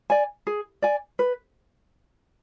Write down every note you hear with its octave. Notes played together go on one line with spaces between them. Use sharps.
D5 G#5
G#4
D5 G#5
B4